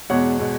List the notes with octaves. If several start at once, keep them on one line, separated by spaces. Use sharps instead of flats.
E2 B2 G#3 C#5 F#5
B2 G#3